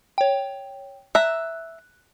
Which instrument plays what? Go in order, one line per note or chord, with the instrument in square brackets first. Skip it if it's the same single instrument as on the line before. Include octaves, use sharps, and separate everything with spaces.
[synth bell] C#5 G5
[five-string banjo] E5 A#5 [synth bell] F#6